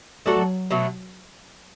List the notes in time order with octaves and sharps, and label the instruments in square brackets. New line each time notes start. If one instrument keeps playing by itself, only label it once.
[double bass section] F#3 [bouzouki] A3 D4 F#4 A4
[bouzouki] B2 F#3 A3